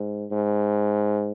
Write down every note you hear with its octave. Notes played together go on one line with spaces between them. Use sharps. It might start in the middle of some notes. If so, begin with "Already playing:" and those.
Already playing: G#2
G#2